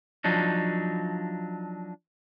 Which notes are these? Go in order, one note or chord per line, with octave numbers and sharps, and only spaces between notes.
F3 F#3 D4 D#4